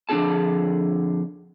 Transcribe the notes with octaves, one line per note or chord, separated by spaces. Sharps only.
F2 D3 D4 E4 G#4 A5